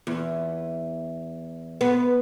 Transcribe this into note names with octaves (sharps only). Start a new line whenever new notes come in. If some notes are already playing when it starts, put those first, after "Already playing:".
E2
B3